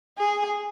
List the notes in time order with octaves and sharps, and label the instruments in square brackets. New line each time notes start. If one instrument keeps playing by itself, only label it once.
[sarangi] G#4